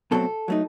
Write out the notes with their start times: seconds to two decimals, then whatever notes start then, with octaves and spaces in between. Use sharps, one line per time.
0.11 B2 F#3 A3 C4 A4
0.48 F#3 A3 D#4